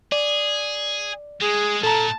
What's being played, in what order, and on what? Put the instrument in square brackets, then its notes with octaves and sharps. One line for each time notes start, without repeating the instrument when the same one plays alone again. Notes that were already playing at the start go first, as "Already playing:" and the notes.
[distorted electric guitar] G#4 [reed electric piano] D5
[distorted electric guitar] G#3 [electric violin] G#4
[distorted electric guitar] A#2 [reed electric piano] A4 A#5 [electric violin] A5